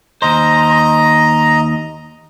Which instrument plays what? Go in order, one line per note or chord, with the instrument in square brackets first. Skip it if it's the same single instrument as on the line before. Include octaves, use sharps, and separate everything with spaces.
[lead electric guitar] D#2 C5 [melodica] D#5 A#5